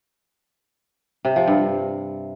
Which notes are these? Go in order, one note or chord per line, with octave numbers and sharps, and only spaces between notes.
C3
F3
G2